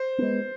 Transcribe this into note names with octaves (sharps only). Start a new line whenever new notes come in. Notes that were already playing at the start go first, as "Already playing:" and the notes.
Already playing: C5
G#3 B3